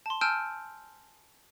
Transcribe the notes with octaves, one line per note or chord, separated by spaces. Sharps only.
A5 C6
G#5 A5 E6 F6 G6 D7